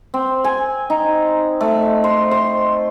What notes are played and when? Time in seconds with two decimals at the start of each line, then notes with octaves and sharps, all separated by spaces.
0.14 C4
0.44 G#5
0.90 D#4
1.61 A3
2.04 C5
2.31 C5